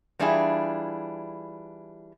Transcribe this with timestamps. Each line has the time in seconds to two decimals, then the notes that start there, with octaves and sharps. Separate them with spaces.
0.19 E3 G3 D4 E4 F4 G#4